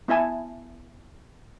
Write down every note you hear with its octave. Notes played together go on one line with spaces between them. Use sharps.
B3 E4 E5 G#5 A5